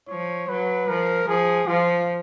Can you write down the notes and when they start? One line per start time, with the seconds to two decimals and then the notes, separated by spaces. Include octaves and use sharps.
0.09 F3 C#5
0.49 F#3 B4
0.89 F3 A#4
1.28 F3 G#4
1.67 F3 F4